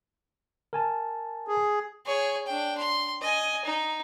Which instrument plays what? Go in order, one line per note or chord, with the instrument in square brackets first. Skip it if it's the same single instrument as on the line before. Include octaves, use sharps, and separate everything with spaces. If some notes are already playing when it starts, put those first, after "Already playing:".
[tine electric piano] A#4 G#5 A5
[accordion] G#4
[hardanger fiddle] G#4 C#5
D4 G5
C6
D#5 G#5
D#4